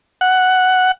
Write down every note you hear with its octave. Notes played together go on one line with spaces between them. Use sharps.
F#5